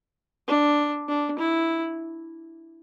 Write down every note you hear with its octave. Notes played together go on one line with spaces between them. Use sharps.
D4
D4
E4